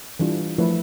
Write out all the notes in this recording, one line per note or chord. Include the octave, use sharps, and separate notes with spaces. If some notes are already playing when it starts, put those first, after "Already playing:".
E3 G3 D4 F4
F3 A3 E4 B4